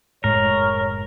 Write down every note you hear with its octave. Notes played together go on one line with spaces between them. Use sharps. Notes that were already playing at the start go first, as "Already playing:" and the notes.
F#1 A2 G#3 A#4 C#5